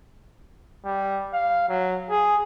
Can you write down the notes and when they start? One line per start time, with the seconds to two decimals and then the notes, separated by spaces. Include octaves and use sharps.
0.85 G3
1.33 F5
1.69 F#3
2.10 G#4